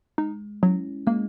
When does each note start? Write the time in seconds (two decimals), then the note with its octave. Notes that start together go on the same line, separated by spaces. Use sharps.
0.18 G#3 D#4
0.63 F#3 C#4 E4
1.07 G#3 A#3